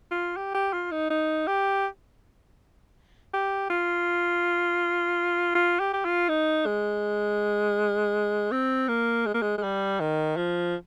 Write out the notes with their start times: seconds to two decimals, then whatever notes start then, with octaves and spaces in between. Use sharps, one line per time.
0.11 F4
0.37 G4
0.55 G4
0.73 F4
0.92 D#4
1.10 D#4
1.47 G4
3.34 G4
3.70 F4
5.55 F4
5.80 G4
5.93 G4
6.05 F4
6.29 D#4
6.66 G#3
8.52 C4
8.88 A#3
9.26 G#3
9.34 A#3
9.42 G#3
9.58 G#3
9.63 G3
10.00 D#3
10.37 F3